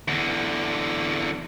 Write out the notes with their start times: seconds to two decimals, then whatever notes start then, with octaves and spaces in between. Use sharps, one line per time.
0.08 E2 D3